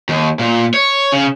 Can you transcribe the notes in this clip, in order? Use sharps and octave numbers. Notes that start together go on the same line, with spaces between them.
D#2
A#2
C#5
C#3